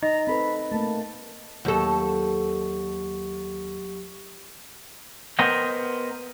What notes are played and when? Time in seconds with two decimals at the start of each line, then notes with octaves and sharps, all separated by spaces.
0.03 D#4 D#5 A#5
0.27 C4 A4 B4 B5
0.72 A3 A#3 A5
1.65 D#2 F#3 G4 A4 C#6
5.39 B3 A#4 C5 D#5 F#5 G5